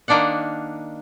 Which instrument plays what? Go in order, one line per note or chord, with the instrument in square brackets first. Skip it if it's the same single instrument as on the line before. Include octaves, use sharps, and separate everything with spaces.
[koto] D#3 A#3 D4 D5 F#5